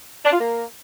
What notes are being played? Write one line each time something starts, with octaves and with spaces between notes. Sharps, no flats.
D4
F4
A#3